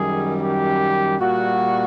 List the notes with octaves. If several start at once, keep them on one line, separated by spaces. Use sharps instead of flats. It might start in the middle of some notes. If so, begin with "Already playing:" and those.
Already playing: F#2 D#3 G3 G#4
G4
A#2 G3 F#4